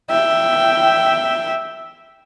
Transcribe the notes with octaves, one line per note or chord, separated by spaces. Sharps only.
E5 G5